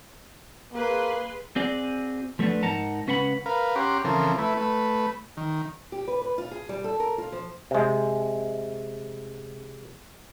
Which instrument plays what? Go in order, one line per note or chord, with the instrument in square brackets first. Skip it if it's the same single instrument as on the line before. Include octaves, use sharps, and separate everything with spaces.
[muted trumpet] A#3 [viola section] G#4 B4 C6
[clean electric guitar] C4 F#4 G#4 D5
F3 A3 B3 C4 D4
G#2 D#4 A#4 F#5 A5 A#5
C#2 C#4 B4 F#5 G#5 B5
[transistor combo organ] A#4 B4 F5
C#4 G4 F#5 A#5 C6 D6
C#3 E3 F3 C4 A4 A#4
A3 E4 B4
A3 B4
D#3
[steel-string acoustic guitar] G4
B4
B4
F4
G#4
G3
A4
A#4
F4
F3
[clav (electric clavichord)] C3 G#3